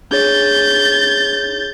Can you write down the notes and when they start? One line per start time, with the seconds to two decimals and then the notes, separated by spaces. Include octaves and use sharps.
0.11 D4 G#4 C#5 G6 A6